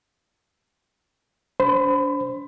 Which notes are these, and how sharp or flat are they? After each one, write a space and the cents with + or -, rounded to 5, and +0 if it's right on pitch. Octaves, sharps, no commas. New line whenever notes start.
D4 -35 C5 +0 B5 +25